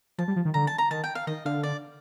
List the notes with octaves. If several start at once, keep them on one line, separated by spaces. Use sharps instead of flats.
F3 A5
G3
F3
D#3
D3 A#5
A5
A#5
D#3 A5
G5
F5
D#3 D#5
D3 F5
D5